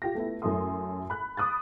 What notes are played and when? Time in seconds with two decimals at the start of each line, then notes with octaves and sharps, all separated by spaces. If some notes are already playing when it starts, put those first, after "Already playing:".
0.02 F4 G4 A#6
0.15 A3 B3 E4
0.42 F#2 F#3 A3 E4 C6 D#6
1.10 B5 F#6
1.37 B5 D6 D#6 F#6 A6